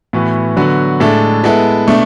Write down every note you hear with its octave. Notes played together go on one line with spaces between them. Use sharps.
A2 E3 B3 F#4
D3 F#3 B3 F#4
A2 G#3 D4 A4 E5
G#3 B3 E4 A4
B2 A3 D4